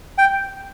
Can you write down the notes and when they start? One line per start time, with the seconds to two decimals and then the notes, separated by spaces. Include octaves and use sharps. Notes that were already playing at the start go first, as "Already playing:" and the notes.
0.18 G5